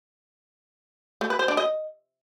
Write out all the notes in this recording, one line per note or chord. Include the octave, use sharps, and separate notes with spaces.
A3
B4
C5
D4
D#5